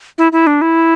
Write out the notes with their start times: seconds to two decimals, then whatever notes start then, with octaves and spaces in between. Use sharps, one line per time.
0.18 E4
0.32 E4
0.47 D4
0.62 E4